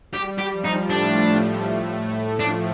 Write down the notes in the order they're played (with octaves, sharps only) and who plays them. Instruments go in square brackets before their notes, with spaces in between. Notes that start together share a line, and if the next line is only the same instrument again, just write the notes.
[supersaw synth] G3 [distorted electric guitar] G4
[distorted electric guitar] G4
[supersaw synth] F3
[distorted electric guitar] D#4
[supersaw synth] A2 A3 [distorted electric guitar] D4
[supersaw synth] F3 [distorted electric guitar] D4